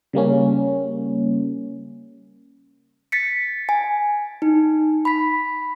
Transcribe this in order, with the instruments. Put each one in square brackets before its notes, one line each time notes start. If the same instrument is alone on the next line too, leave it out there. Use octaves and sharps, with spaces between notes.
[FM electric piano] C#3 G3 A#3 C#4
[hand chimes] A6 B6 C#7
G#5
D#4
B5 B6